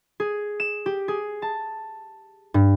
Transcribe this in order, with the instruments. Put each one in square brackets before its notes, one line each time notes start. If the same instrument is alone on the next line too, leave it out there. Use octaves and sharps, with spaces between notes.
[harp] G#4
E7
G4
G#4
A5
G2